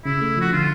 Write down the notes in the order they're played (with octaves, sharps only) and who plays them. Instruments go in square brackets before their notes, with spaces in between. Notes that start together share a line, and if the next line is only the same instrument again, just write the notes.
[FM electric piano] C#3 [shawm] E4
[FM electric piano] A3
[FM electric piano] F3 [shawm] F#4
[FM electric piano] D3 [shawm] F4